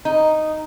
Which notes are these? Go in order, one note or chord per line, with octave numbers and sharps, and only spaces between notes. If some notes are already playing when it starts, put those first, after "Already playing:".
D#4